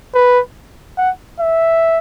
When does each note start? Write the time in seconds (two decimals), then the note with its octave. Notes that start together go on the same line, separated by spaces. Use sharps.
0.15 B4
0.97 F#5
1.40 E5